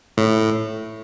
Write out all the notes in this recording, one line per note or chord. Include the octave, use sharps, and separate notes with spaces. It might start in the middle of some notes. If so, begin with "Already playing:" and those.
A2